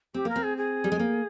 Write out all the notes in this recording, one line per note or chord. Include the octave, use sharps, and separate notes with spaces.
C4 G4
A#3 A#4
C4
G#4
G#4
G3
G#3
A#3